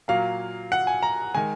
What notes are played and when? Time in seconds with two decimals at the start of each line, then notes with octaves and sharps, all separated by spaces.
0.08 A#2 F#3 A#3 F5
0.72 F#5
0.87 G#5
1.03 A#5
1.35 D#3 G#3 G#5